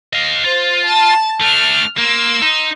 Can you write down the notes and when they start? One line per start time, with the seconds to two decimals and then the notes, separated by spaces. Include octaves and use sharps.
0.13 D#5 F5
0.44 F4 C5
0.86 A5 A6
1.41 A3 D4 F6
1.98 A#3 C6 E6
2.42 D#4